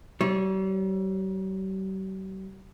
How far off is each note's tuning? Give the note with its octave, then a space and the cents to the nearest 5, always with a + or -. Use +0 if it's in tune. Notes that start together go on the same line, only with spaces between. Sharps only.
G3 -45 C#5 -25